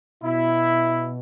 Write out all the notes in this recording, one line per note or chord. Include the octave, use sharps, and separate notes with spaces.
B2 E4